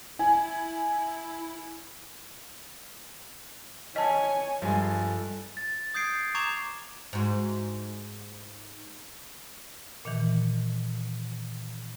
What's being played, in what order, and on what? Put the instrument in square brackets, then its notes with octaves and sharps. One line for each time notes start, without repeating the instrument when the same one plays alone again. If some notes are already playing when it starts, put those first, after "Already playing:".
[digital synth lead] E4 [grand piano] G#5
[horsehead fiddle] C#5 G#5 [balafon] D#5 A5
[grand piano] G2 G#5 [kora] F3 G#3 [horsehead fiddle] A4
[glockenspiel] A6
D#6 G6 G#6 C7 D7
A#5 C#6 D6 G#6 E7 F7
[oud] G#2 F#4
[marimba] A#2 D#3 E3